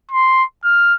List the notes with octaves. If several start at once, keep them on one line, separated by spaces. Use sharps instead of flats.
C6
F6